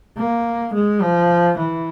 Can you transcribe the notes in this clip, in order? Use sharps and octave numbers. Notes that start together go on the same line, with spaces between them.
A#3
G#3
F3
E3